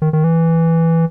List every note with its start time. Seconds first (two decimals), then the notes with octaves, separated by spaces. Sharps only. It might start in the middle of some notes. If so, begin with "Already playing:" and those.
0.02 D#3
0.13 D#3
0.24 E3